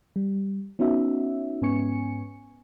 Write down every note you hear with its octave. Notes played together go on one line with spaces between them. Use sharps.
G3
B3 C#4 D#4 F#4 E5
G#2 B3 C#4 G#5 C#6 C#7